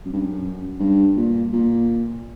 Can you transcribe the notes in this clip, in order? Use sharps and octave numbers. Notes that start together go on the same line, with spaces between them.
F#2
G2
F#2
G2
A#2
A#2